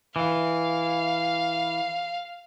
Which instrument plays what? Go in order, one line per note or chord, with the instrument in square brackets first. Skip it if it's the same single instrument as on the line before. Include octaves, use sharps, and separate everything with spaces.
[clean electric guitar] E3 [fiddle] F5